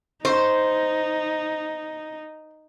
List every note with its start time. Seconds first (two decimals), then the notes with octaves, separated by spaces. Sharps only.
0.25 D#4 C5